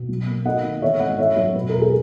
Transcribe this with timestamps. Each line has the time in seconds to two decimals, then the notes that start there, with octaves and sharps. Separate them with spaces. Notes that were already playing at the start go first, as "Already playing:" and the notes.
Already playing: B2
0.09 B1
0.28 A#3
0.45 A#3 D#5 F#5
0.63 D#3
0.82 E3 C#5 E5
1.00 G#1 D#5 F#5
1.18 E3 C#5 E5
1.36 F#2 C#5 E5
1.55 B2 B4
1.69 E1 A#4
1.81 G#4